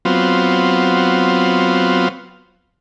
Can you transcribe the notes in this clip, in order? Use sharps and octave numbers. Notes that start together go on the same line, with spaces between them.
F#3 B3 C4 F4